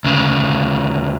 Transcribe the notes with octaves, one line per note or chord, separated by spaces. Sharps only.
D2 C#3